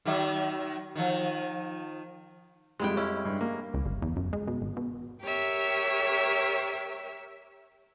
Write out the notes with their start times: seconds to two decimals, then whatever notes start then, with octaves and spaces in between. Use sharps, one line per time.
0.05 D#3 F#3 E5
0.95 D#3 F3
2.79 F2 G3 G#3 E4 G5
2.97 C#4 E4
3.25 G2
3.41 A#3
3.74 C#2
3.86 G1
4.02 E2
4.16 F#2
4.33 G#3
4.47 B2
4.62 G#1
4.77 B2
5.22 G4 A#4 C#5 E5